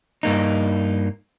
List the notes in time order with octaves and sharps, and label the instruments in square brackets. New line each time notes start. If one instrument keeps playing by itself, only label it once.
[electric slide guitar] G2 A#3 D#4